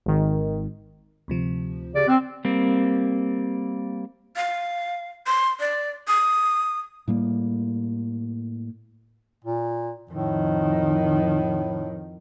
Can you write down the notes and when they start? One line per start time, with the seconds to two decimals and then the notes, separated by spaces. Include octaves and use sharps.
0.06 G#1 D#3
1.28 D2 C3 F3
1.94 C#3 G4 D5
2.08 C4 E6 F#6
2.45 G3 A#3 C4
4.36 F5
5.27 C6
5.60 D5
6.08 D#6
7.08 A2 G3 A#3
9.44 A#2
10.11 F2 A2 D#3